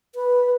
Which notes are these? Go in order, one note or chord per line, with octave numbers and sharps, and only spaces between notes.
B4